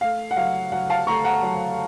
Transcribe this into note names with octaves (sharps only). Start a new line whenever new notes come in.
A3 F5
F#5
F#3 F5
F#3 F#5
F5 A5
A3 A#5 C#6
F#5 A#5
F#3